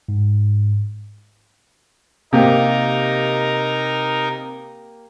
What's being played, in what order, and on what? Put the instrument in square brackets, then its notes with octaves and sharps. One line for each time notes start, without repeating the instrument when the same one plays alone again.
[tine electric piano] G#2
[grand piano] C3 [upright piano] A#3 G4 [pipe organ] D#4 A#4